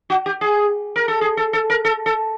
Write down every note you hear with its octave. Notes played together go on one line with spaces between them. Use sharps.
F#4
G4
G#4
A#4
A4
G#4
A4
A4
A#4
A4
A4